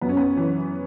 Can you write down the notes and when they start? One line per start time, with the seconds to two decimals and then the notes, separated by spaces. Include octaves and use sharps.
0.01 F#2 B3
0.09 C#4
0.17 B3
0.37 E3